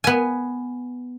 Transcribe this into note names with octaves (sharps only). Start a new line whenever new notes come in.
B3 G#5